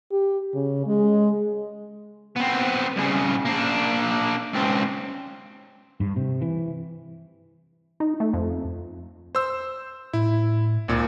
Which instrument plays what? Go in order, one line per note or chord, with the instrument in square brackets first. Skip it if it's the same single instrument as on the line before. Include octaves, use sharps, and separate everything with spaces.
[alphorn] G4
C#3
G#3
[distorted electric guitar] B3 C4
C2 C#3
A#3 D4
C#2 C4
[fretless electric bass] G2
C3
E3
[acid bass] D#4
A3
F2
[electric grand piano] C5 E6
[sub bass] A2 [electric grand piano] E4
[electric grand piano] G#1 A#2 [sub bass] C#2